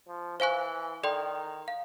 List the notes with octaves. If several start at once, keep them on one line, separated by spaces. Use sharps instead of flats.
F3
E3 C5 F5 G#5 C#6 F#6
D#3 A4 D5 G5 C6
F5